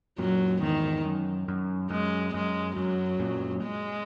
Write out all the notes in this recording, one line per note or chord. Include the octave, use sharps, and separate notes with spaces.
F#2 A#2 F#3
E2 G#2 D#3
F#2
F#2
F#2 G#3
F#2 G#3
F#2 F#3
F#2 A#2
G#3